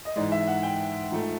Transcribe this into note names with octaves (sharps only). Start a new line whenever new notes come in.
D#5
G#2 E3 G#3 D5
E5
F#5
G5
G#2 F3 A3